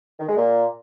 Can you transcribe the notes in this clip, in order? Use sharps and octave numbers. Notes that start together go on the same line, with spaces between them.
D#3
G#3
A#2